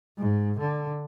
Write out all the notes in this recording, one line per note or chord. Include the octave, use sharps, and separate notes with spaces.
G#2
D3